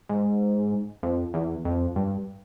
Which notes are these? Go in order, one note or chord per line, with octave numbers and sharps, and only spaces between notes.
G#2
F2
E2
F2
G2